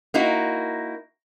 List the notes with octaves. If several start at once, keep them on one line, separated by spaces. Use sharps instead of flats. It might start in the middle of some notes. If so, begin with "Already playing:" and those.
A#3 D#4 E4 F#4